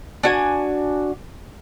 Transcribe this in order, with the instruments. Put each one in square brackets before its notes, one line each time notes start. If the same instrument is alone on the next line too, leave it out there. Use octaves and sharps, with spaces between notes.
[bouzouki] D4 F#4 G#5